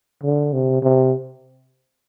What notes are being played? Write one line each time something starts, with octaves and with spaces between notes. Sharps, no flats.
D3
C3
C3